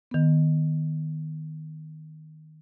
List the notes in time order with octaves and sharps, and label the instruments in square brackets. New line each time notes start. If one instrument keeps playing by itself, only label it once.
[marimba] D#3 B3